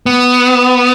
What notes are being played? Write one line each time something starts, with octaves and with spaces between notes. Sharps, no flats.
B3